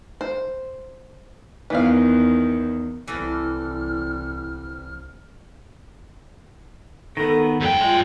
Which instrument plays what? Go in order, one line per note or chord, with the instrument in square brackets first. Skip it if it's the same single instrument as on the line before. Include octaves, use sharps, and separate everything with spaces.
[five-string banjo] C5
[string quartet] E2 D#3 [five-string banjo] E3 B3 F5
[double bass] C2 [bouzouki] E3 A4 [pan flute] F6
[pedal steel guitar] D#3 B3 [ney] A4
[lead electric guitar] F#2 G5
[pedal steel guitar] G#3 [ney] F4